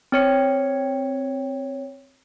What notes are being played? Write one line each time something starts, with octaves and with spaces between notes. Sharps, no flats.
C4 C#5 C#7